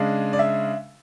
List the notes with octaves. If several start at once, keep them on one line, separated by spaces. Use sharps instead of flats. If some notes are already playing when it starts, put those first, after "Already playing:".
Already playing: C#3 G#3 D4
D5
E5